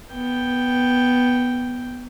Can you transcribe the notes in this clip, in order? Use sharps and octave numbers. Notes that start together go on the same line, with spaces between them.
B3 G5